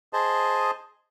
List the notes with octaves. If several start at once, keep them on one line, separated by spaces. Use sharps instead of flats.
G#4 C5 D#5 A5